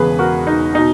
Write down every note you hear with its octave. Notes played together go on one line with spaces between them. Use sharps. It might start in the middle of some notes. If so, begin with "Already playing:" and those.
Already playing: E1 E2 C#3 G#4 B4
F#4 A#4
D#4
B2 D#4